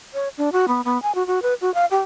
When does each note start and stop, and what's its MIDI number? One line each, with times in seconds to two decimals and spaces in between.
0.14 0.28 73
0.38 0.49 62
0.52 0.66 66
0.68 0.81 59
0.85 1.01 59
1.02 1.14 80
1.15 1.26 66
1.27 1.42 66
1.42 1.54 71
1.61 1.73 66
1.74 1.85 77
1.91 1.99 67